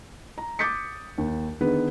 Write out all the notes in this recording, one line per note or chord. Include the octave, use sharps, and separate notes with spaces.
A#5
D6 D#6 G6 A6 B6 C#7
D#2
D3 D#3 B3 G#4 B4